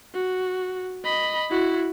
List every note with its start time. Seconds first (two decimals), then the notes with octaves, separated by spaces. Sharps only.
0.14 F#4
1.05 D#5 B5
1.50 E4 F#4